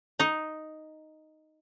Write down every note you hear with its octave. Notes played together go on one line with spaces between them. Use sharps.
D#4 D#5